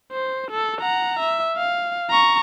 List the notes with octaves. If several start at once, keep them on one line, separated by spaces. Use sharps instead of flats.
C5
A4
F#5 A#5
E5
F5
A#5 C#6